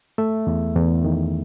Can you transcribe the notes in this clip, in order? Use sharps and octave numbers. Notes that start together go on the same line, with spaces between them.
A3 E5
E2
E2
D#3